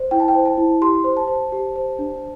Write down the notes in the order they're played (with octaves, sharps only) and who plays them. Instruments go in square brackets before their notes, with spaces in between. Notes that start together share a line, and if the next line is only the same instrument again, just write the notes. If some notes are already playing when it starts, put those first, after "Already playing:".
Already playing: [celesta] C5
E4 G5
A5
G5
C5
A5
E4
G4 C6
C5
A5
C5
G4
C5
D4